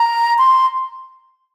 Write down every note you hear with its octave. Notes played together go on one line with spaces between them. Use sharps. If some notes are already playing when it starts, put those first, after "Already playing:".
Already playing: A#5
C6